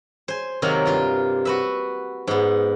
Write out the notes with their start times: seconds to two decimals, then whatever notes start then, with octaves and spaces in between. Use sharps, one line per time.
0.28 C5 G#5
0.62 C3 D#3 F#3 A#3 A#4
0.86 G2 F4
1.45 F#4 B4 E5
2.27 G#2 B3